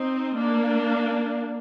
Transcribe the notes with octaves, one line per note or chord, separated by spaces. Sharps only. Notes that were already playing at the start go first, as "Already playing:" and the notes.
Already playing: C4 D#4
A#3 D4